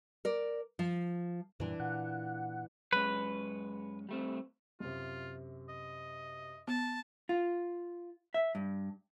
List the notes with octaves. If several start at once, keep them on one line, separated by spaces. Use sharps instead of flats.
A#4 D5
F3
F#2 A#2 E3 G3 D4
A#2 F#5
F#2 G#3 C#4 B4
G3 A3 C4
F#2 C3 F4
D#5
B3 A5
F4
E5
G2